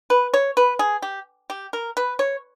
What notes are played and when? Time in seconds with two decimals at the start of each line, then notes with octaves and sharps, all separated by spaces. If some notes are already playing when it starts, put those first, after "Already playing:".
0.10 B4
0.34 C#5
0.57 B4
0.79 G#4
1.02 G4
1.50 G4
1.73 A#4
1.97 B4
2.19 C#5